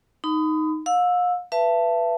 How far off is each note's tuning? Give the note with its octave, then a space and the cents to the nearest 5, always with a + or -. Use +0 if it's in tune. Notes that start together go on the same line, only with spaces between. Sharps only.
D#4 +0 B5 +35
F5 +40 E6 +0
B4 +0 E5 +35 A5 +5